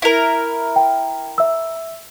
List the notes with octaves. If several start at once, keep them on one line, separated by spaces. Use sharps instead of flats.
E4 A#4
G5
E5 E6